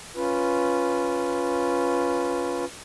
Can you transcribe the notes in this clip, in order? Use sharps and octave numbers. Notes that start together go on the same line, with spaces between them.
C#4 F4 B4